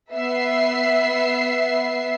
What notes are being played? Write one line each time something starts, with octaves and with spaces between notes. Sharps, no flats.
B3 E5 C7